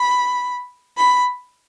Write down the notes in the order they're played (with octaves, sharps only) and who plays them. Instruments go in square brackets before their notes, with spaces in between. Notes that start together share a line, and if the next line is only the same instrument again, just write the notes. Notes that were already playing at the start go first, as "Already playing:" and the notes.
Already playing: [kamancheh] B5
B5